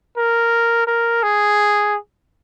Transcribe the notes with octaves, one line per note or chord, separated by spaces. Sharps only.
A#4
A#4
G#4